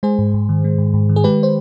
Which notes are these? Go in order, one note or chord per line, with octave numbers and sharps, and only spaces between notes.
G#3 G#4 C5
G#2
G#2
D#3
G#3
G#2
G#2
D#3
G#4
G#3 G4 B4
C5